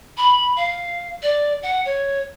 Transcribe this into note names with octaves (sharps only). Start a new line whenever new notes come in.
B5
F5
D5
F#5
C#5